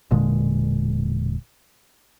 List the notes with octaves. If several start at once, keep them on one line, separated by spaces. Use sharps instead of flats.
E1 A#2 D3 G#3